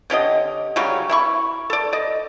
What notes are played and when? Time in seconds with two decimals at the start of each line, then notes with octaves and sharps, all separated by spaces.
0.10 D3 C#4 G4 D#5
0.76 C#3 F#3 G3 C#4
1.09 E4 B5 C#6
1.70 A4 D5
1.93 D5 D#5